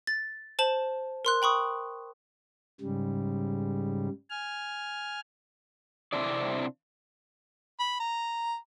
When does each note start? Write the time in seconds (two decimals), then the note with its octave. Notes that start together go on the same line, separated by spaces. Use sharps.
0.07 A6
0.59 C5 A5 E7 F#7
1.25 A#4 C6 F#6
1.42 G5 B5 C#6 D#6
2.81 G#2 C#3 G3
4.30 G#5 F6
6.13 C3 C4 D4 E4 D5
7.79 B5
8.00 A#5